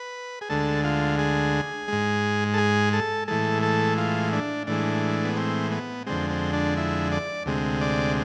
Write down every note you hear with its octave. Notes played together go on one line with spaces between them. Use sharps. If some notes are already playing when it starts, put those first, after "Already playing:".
Already playing: B4
G#4
D2 D3 G#3 A4
F4
G#4
G#2 G#3
A4
G#4
A4
A2 E3 G#3 A4
A4
F4
D4
A2 E3 G#3 D4
B3
C4
B3
F2 D3 G#3 C4
C4
D4
E4
D5
D2 C3 G#3
D5